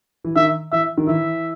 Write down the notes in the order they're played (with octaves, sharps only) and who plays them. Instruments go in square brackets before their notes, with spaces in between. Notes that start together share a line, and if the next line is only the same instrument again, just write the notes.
[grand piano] E3
[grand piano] D#3 [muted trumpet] E5
[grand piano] E3 [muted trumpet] E5
[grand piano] D#3
[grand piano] E3 [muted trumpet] E5